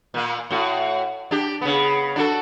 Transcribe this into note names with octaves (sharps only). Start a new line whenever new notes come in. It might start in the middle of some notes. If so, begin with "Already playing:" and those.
A#2 A#3
A2 F#4
D4 G4
C#3 B3
D4 F#4 A4